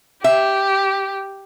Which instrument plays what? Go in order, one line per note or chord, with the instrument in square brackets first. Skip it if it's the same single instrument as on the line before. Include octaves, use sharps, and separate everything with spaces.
[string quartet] G4 [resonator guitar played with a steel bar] E5